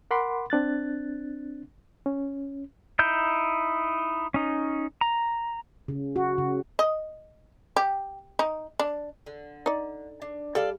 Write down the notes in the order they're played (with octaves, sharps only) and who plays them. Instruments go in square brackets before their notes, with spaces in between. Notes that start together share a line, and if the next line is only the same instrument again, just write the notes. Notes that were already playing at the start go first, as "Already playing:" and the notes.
[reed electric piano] A#4 F#5 B5 C6 D6
C4 D4 F#6 A6
C#4
[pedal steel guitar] D#4 E4 G6
C#4 D#4
A#5
[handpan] C#3
F#4
C#3
[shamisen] D#5
G4
D#4
D4
[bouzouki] D3
[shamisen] D#4 D5
[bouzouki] D4
[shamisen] G3 [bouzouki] A4 D5 F5